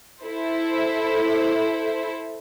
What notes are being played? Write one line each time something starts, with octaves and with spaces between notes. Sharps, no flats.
E4 A4 C5